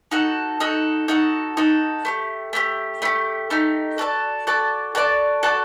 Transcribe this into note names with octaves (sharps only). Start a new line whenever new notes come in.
D#4 F#4 A4
D#4 F#4 A4
D#4 F#4 A4
D#4 F#4 A4
A3 D#4 G4
A3 D#4 G4
A3 D#4 G4
A3 D#4 G4
F#4 A4 D5 A5
F#4 A4 D5 A5
F#4 A4 D5 A5
F#4 A4 D5 A5